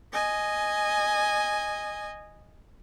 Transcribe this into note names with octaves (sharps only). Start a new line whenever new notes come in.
D#5 G#5